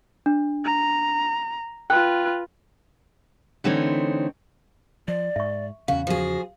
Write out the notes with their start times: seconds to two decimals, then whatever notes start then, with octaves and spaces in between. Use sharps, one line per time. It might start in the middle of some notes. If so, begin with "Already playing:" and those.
0.26 D4
0.65 A#5
1.90 F4 B4 G5 F#6
3.64 D3 E3 A3 C4 D#4 C#5
5.08 F3 D5
5.36 G#2 E5 C#6
5.88 E2 C#3 C#4 F#4 F5
6.07 F3 F#4 G#4